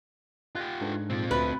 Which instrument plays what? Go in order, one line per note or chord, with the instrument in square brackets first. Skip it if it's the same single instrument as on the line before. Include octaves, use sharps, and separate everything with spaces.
[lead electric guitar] F4 G4 [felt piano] F#6 G#6 A#6
[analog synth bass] G#2 [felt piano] D4 A4 B4
[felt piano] A#2 [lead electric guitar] C4 F4
[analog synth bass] D2 [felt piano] F#4 E5 [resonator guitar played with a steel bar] B4